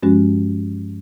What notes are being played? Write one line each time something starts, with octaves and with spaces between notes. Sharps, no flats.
G2 F3 G#3 C#4 F#4